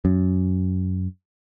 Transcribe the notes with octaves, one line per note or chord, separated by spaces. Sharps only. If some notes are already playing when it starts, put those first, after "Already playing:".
F#2